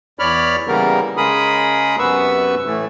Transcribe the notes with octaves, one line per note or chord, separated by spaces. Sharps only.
E2 C#5 D5 B5 F6
C#3 E3 G3 A#3 B3 A#4
C#3 G#3 G#4 A#4 B5 D#6
F#2 C3 B3 B4 C#6 E6
A2 E3 A3